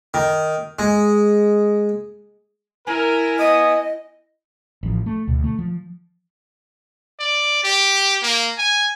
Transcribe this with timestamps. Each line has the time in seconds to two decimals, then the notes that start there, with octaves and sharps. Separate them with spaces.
0.14 D#3
0.79 G#3
2.87 E4 A#4 G#5
3.39 B3 D#5 D#6
4.83 A1 F3
5.06 A3
5.27 D2 B2
5.44 A3
5.59 F3
7.20 D5
7.64 G4
8.23 A#3
8.58 G#5